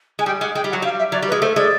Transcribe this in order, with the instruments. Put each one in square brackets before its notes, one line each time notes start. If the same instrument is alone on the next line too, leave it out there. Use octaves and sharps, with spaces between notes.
[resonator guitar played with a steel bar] G#3 [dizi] G#5
[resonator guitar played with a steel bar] G3 [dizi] G5
[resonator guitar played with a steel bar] G#3 [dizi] F#5
[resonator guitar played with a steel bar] G#3 [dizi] G5
[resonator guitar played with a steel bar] G3
[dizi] F#5
[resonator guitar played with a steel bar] F#3
[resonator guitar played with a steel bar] G3 [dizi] F5
[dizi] E5
[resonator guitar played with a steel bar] F#3 [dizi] D5
[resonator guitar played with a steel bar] G3
[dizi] B4
[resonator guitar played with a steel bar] G#3
[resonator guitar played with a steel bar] A3 [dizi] C5
[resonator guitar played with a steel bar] G#3 [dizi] D5